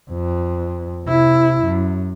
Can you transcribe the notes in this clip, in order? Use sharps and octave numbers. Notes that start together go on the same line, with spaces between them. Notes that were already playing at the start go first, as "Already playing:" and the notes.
F2
C3 E4
F#2